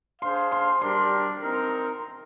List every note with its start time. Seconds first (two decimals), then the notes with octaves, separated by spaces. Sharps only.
0.22 D4 G#4 C5 F5 C6
0.52 C6
0.82 G3 D4 G4 A#4 C6
1.42 C4 D#4 A#4